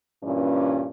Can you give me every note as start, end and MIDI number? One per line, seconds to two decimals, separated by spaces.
0.22 0.86 43
0.22 0.86 46
0.22 0.86 52
0.22 0.86 61